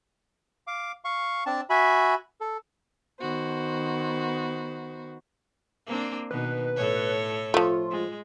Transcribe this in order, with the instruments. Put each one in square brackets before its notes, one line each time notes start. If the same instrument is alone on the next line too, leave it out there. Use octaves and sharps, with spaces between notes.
[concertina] F5 D6
F5 C#6
C4 D4 A5
F#4 E5 G#5 B5
A4
[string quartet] D#3 B3 F#4 C5
[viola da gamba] A#3 C4 D4
[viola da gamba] B2 D#3 [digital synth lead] B4
[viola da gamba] A2 A4 C#5
[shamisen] F3 A3 [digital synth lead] F4
[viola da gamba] G#3